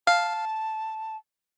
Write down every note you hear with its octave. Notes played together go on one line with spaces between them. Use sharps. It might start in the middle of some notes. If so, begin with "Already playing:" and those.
F5 A5